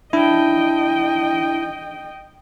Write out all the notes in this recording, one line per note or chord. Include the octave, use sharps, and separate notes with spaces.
D4 E4 D#5 G5